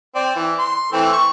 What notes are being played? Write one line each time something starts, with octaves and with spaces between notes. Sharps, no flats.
C4 D5
E3
C6
E3 A3 C4
C#6